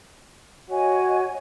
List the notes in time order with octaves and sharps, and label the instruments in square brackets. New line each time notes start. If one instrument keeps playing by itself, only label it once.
[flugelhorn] F#4 [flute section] C#5 D#5 G#5